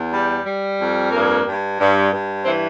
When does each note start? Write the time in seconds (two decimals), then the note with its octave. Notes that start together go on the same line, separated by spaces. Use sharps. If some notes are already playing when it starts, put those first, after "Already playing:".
Already playing: E2
0.13 G3
0.46 G3
0.80 F2
1.12 G2 A#3
1.46 G2
1.79 G2
2.12 G2
2.45 E3 C4